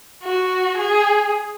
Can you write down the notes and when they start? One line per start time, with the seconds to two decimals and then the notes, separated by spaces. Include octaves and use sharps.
0.24 F#4
0.78 G#4